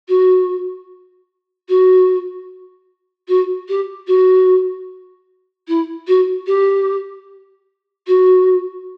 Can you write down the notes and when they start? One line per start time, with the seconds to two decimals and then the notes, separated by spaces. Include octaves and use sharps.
0.08 F#4
1.69 F#4
3.28 F#4
3.69 G4
4.07 F#4
5.68 E4
6.07 F#4
6.47 G4
8.07 F#4